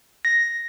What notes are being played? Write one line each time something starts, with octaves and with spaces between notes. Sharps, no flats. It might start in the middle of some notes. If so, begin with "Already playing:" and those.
A#6